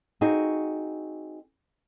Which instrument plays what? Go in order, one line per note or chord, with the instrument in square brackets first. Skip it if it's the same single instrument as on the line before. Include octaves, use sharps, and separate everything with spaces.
[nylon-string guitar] C4 D#4 F#4 G#4